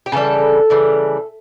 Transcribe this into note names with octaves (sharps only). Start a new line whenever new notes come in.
G4
C#3 E3 G3 A4
C#3 E3 G3